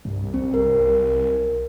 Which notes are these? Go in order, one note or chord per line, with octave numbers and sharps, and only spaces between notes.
C2 G2
B1 C4
A#4